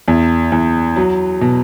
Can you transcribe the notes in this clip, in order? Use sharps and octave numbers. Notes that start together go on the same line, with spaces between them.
E2
E2
F#3
B2